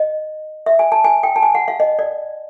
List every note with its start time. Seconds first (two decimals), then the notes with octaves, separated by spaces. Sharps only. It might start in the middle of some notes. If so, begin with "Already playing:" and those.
Already playing: D#5
0.66 E5
0.79 G#5
0.92 A5
1.04 G#5
1.23 G5
1.36 A5
1.43 G#5
1.55 F#5
1.68 F5
1.80 D#5
1.99 D5